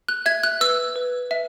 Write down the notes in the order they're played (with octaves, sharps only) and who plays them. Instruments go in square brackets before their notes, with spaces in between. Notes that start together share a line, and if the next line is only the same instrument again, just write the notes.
[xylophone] F#6
E5 G#6
F#6
B4 E6
B4
E5